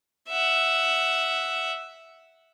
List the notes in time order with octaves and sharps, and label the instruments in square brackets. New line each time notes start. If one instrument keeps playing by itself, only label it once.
[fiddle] E5 F#5